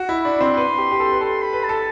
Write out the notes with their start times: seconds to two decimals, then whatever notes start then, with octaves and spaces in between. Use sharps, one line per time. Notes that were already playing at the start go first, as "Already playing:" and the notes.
Already playing: F#4
0.09 E4
0.24 D4 B5
0.41 C4 C6
0.57 B4
0.78 G4
0.92 G4
1.00 A4
1.12 B4
1.21 A4 C6
1.42 B5
1.53 B4
1.64 A5
1.69 A4